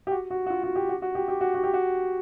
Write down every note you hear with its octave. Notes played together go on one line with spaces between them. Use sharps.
G4
F#4
F#4
F#4
F4
F#4
G4
F#4
F#4
G4
G4
F#4
F#4
G4
F#4